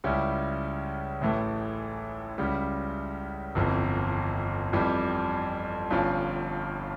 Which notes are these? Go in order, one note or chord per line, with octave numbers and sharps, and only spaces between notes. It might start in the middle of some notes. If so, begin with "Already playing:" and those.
C#2 C#3 G3 C#4 E4
A1 A2 E3 A3
C#2 C#3 G3
G1 F2 E3
F2 E3 G3
G1 G2 F3 C#4 F4